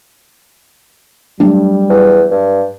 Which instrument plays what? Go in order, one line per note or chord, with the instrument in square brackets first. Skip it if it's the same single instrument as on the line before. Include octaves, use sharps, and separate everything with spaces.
[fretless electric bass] F#3 A3 D4 [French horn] G3
[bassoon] E2
G2